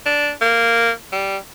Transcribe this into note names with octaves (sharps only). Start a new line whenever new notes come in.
D4
A#3
G3